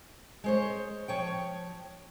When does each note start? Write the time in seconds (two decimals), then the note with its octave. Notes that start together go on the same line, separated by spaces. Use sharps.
0.44 G#3 C5 C#5
1.08 F3 C#5 G5